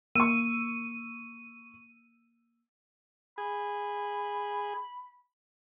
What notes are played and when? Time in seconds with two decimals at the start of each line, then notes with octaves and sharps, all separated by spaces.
0.15 A#3 C#6 E6 D#7
3.38 G#4 B5